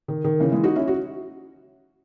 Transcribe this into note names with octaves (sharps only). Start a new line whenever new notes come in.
D#3
D#3
C#3 E3
E3 G#3
D#4 F#4
C#4 E4
F#4